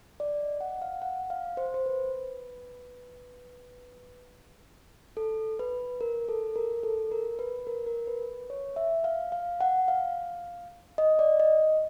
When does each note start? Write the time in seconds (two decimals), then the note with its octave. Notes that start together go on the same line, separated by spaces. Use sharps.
0.20 D5
0.40 D#5
0.61 F#5
0.82 F5
1.02 F#5
1.30 F5
1.57 C5
1.74 C5
1.86 B4
5.17 A4
5.59 B4
6.01 A#4
6.29 A4
6.56 A#4
6.83 A4
7.12 A#4
7.39 B4
7.67 A#4
7.86 A#4
8.07 B4
8.50 C#5
8.76 E5
9.04 F5
9.32 F5
9.61 F#5
9.88 F5
10.98 D#5
11.19 D5
11.40 D#5